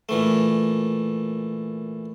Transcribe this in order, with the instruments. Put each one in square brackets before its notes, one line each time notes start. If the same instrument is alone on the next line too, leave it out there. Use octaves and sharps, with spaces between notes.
[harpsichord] A#2 E3 A3